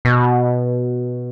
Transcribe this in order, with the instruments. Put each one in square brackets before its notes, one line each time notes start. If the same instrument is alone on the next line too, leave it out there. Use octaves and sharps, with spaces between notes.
[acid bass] B2